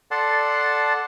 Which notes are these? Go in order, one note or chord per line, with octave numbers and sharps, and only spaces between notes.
A4 D5 F#5 A5 C6